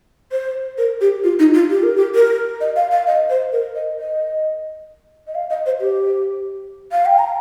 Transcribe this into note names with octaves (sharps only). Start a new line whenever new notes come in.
C5
A#4
G4
F4
D#4
F4
G4
A#4
G4
A#4
D#5
F5
F5
D#5
C5
A#4
D#5
D#5
D#5
F5
D#5
C5
G4
F5
G5
A#5